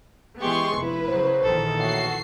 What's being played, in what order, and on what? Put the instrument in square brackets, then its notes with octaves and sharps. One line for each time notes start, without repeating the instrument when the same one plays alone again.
[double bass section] E3 B3 [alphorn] G#3 [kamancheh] G4 [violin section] G#4 C6 C#6
[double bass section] F1 [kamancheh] E4 [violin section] B4
[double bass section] C#3 F#3 [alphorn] C5
[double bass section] A#1 D#3 E3 [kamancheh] A4
[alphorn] A2 [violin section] F#4 C7